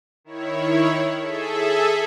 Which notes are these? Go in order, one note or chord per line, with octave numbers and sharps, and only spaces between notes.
D#3 E4 C#5
G#4 A4 E5